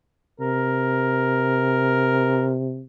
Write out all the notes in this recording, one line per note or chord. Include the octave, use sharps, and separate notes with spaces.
C3 A#4